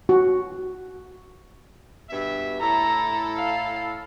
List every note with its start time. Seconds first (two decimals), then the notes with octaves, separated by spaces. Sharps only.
0.09 F#4
2.10 G2 B2 E5
2.61 A2 E4 A4 A#5
3.38 F5